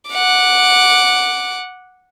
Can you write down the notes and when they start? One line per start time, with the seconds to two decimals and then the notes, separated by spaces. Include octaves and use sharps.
0.11 F#5 D6